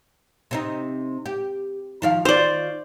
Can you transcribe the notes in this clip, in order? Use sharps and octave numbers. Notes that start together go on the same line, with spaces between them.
C3 C4 D#4
G4
D#3 F3 F5
D#3 F4 C5 D5